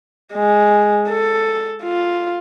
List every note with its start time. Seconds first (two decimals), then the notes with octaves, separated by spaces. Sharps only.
0.34 G#3
1.09 A4
1.83 F4